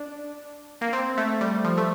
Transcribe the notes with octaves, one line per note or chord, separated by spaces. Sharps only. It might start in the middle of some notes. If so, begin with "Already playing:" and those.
Already playing: D4
A#3
C4
A3
G3
F3
A3